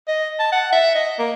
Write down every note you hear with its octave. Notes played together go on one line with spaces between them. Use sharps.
D#5
A5
F#5
E5
D#5
A#3